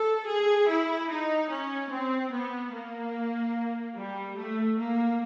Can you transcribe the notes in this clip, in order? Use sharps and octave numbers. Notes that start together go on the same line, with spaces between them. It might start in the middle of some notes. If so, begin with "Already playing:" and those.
Already playing: A4
G#4
E4
D#4
C#4
C4
B3
A#3
G3
A3
A#3